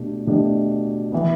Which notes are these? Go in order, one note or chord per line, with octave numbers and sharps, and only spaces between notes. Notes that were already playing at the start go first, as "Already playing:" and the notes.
Already playing: B2 A3 D4 G4
B2 A3 D4 G4
E3 B3